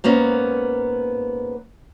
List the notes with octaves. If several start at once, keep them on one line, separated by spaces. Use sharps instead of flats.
G#2 A#3 B3 C#4